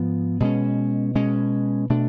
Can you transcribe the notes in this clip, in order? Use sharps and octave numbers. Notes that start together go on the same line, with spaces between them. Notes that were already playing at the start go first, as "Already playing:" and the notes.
Already playing: G#2 F3 B3
B2 G#3 C#4
B2 G#3 C#4
B2 A3 D4